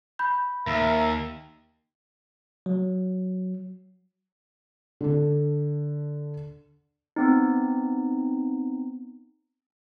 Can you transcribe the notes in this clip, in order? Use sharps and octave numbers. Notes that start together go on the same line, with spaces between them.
B5 G6
D#2 A#4 E5
F#3
D3 D4
B3 C4 D#4